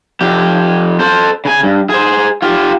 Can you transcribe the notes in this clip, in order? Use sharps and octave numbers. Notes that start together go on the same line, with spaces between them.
F2 G4
A4 C5
C#3 G#5
G2
G#4 C5
F4 G4